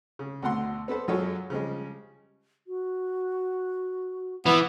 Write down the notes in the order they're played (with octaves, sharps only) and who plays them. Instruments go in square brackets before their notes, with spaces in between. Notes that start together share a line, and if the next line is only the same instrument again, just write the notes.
[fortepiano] C#3
D2 B2 D3 F#5 C6
B3 A4 B4 C5
F#2 F#3 F4 G#4 A4 C#5
C#3 F3 G3 G#3
[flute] F#4
[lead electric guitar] E3 [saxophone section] B3